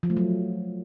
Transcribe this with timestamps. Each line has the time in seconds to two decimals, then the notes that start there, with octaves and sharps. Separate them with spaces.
0.03 F3
0.10 A3
0.17 F#3